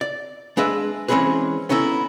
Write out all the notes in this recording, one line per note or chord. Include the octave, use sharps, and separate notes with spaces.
D5
G#3 D4 B4 D#5 E5
E3 G#3 C4 C#4 G#4 B4
B3 C#4 D#4 E4 A4